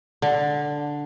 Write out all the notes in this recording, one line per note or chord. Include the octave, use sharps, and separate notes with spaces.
D3